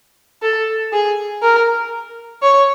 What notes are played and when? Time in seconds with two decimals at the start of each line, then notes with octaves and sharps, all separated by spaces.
0.42 A4
0.92 G#4
1.42 A#4
2.43 C#5